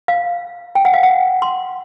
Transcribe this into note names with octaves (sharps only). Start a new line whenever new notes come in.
F5
G5
F#5
F5
F#5
C6